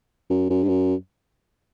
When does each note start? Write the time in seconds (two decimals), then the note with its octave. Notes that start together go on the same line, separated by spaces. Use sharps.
0.30 F#2
0.50 F#2
0.63 G2
0.69 F#2